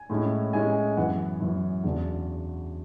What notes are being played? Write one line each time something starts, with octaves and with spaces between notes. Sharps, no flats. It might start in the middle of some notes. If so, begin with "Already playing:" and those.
Already playing: G#5
A2 G#3 C#4 E4
A2 G#3 C#4 E4 G#5
F#2 E3 B3 F#5
F#2 E3 B3
E2 C#3 F#3 B3 D4